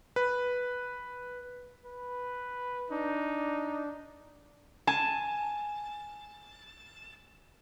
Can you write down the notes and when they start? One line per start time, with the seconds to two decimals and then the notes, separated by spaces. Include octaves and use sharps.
0.16 B4
1.85 B4
2.91 D4 D#4
4.87 G#5 A5